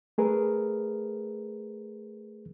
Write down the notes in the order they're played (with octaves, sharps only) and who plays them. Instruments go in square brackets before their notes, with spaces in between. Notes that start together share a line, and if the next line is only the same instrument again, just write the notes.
[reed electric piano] A3 G#4 A#4 B4